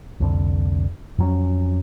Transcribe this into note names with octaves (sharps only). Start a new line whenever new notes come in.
C2 F2 D3
F2 F#3 C#4